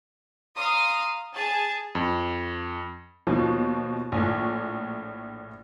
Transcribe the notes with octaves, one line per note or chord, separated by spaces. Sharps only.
F5 A#5 C6 D#6
G#4 G#5 A5
F2
D#2 B2 F3
A#1 A2